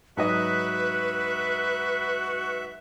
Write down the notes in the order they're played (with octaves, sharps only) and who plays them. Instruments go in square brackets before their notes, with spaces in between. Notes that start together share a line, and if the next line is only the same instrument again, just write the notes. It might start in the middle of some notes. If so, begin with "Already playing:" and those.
[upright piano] G#2 F#3 D#5 [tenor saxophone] F#4 [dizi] B4 [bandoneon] E5